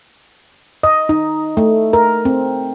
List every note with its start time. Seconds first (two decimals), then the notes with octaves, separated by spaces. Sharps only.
0.83 D#5
1.09 D#4
1.57 A3
1.93 A#4
2.25 C4